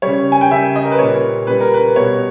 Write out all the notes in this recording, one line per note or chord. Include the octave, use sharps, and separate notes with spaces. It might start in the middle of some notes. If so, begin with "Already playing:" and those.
C#3 G3 C#5
G#5
G5
C#3 G3 E5
D#5
A#4
B4
A#2 G3 C#5
A#2 G3 B4
A#4
B4
B2 G3 C#5